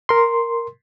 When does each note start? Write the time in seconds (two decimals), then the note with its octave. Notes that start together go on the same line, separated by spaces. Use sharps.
0.09 A#4 C6